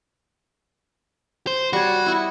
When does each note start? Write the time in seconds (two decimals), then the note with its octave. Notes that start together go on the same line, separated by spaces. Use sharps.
1.47 C5
1.73 G3 F#4 C#5
2.06 E4 D#5